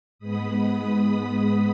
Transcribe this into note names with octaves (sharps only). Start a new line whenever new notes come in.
G#2 G#3 B3 B5 D#6
B5 D#6